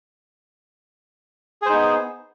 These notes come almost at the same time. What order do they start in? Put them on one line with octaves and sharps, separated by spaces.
G#4 C5 D#4 B3